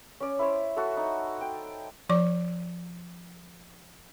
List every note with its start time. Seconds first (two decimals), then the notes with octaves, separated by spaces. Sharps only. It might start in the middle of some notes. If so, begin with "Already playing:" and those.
0.20 C#4 D5
0.39 E4 C5 C#5
0.77 F#4 A4
0.97 D#4
1.41 G5
2.09 F3 D5 D6